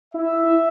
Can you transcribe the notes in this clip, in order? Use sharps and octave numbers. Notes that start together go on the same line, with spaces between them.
E4 E5